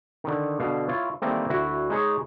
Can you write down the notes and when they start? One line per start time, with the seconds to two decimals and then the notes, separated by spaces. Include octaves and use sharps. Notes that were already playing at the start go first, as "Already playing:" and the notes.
0.24 D3 D#3
0.60 B2 D3 F5
0.88 E4 F4 C#5
1.22 D#3 E3 G3 A3 A#3 C4
1.50 D2 E4 F#4
1.90 G#3 D#4 G#4 C#5